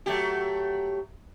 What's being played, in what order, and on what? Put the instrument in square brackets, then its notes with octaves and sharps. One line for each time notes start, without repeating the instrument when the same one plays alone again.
[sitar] F#3 A3 G4